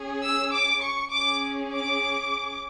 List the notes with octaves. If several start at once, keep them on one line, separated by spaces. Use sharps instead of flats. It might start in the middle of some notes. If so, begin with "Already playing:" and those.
Already playing: C#4 G#4
E6
D6
C#6
C#4 G#4 D6
D6